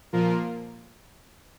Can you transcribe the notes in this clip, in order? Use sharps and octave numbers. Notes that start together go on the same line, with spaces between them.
A#2 F3 A#3 F4 A#4